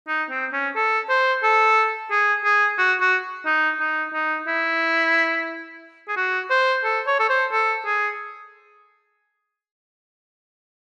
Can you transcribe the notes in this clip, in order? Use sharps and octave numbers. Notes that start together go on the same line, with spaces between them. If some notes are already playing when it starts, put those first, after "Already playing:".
D#4
C4
C#4
A4
C5
A4
G#4
G#4
F#4
F#4
D#4
D#4
D#4
E4
G#4
F#4
C5
A4
C#5
A4
C5
A4
G#4